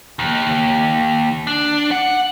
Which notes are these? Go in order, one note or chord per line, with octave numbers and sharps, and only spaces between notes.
D#2
D4
F#5